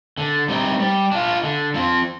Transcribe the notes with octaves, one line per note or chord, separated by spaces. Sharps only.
D3
G3 C4 D#4
G3
D4 F4
D3
F3 C4